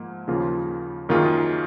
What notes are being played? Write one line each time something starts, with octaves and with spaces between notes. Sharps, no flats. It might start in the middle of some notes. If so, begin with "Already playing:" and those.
Already playing: G#2 F3 A#3
D#2 C#3 F3 A#3 F4
F#2 D#3 A#3 F4 G#4